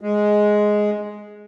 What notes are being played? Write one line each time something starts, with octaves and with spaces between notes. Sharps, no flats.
G#3